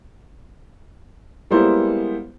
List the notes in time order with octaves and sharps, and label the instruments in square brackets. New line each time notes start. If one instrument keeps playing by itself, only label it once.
[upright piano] G3 G#3 A#3 B3 E4 C5